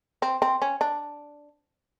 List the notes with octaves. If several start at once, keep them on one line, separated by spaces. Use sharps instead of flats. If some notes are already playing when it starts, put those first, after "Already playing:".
C4
C4
C#4
D4